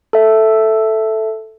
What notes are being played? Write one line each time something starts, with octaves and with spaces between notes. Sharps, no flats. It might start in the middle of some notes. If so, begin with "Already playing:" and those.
A4 E5